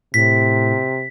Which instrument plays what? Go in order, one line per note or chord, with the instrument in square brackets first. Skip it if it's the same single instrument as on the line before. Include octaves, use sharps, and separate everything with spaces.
[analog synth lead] A2 [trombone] C3 [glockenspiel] B6